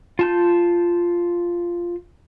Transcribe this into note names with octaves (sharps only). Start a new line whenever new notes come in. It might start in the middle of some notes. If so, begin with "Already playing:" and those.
F4 A5 G6